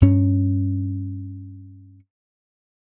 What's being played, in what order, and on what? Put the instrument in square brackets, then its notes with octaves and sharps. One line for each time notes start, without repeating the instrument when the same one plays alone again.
[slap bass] G2 C#4